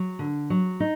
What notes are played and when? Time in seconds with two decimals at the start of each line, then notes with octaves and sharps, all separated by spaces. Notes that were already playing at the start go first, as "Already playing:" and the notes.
Already playing: F#3
0.19 D3
0.50 F#3
0.80 D#4